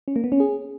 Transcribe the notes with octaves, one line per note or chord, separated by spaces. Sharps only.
C#4
A#3
B3
C#4
G#4